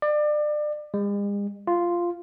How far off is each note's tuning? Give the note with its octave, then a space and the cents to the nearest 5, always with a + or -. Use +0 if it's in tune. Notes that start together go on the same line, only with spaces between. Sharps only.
D5 +30
G#3 -45
F4 -5